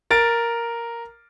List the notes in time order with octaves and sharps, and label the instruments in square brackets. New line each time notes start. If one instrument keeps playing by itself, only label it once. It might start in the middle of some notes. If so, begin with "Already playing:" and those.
[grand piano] A#4 A6 D7